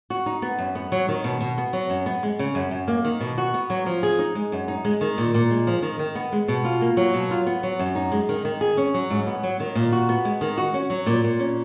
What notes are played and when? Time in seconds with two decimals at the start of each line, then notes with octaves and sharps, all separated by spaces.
0.10 F#4
0.26 D#4
0.42 B3
0.58 F#2
0.75 B3
0.92 F#3
1.09 D#3
1.24 B2
1.41 B2
1.58 B3
1.73 F#3
1.90 F#2
2.06 B3
2.23 G#3
2.39 C#3
2.55 F#2
2.71 F#2
2.88 A#3
3.05 D#3
3.20 B2
3.38 F#4
3.54 B3
3.70 F#3
3.86 F3
4.03 G#4
4.19 D#4
4.35 G#3
4.52 F#2
4.68 D#4
4.85 G#3
5.01 D#3
5.18 A#2
5.34 A#2
5.51 G#3
5.67 F3
5.82 D#3
5.99 D#3
6.15 B3
6.33 G#3
6.48 B2
6.65 F4
6.81 A#3
6.97 F#3
7.14 B2
7.31 F4
7.46 B3
7.63 F#3
7.79 F#2
7.95 D#4
8.12 G#3
8.29 D#3
8.45 D#3
8.61 G#4
8.77 C#4
8.94 F#3
9.10 G#2
9.27 B3
9.43 F#3
9.60 D#3
9.75 A#2
9.92 F#4
10.09 B3
10.25 G#3
10.41 D#3
10.58 F#4
10.74 C#4
10.90 F#3
11.06 A#2
11.24 A#2
11.39 C#4